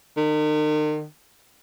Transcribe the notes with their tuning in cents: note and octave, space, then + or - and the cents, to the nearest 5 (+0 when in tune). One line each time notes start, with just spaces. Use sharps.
D#3 -40